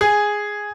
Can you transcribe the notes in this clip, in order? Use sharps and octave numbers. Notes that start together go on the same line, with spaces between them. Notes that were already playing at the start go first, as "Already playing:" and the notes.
G#4